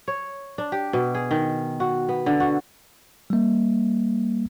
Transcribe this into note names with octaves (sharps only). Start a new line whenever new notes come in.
C#5
D4
G4
B2
G#4
D#3
F#4
B3
D3
F#4
G3 A#3